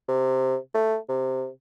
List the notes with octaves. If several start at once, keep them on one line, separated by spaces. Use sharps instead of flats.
C3
A3
C3